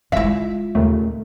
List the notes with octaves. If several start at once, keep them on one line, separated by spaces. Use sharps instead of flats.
G#3 E4 F4 E5 B6
D#2 A#2 C#3 A3